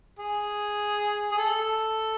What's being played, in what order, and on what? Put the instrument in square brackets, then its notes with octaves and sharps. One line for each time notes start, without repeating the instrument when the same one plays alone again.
[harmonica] G#4
G#4
A4